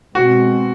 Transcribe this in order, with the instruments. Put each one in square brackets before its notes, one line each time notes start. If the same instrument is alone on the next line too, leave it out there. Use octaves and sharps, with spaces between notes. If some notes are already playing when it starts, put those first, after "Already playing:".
[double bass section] B2 G#3 C4 [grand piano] F#4